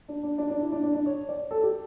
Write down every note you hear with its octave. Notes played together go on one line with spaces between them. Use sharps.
D4
D4
D4
D4
E4
D4
D4
D4
C#5
D5
A4
G4